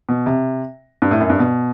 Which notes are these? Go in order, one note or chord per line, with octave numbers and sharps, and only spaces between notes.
B2
C3
G2
A2
F#2
G2
B2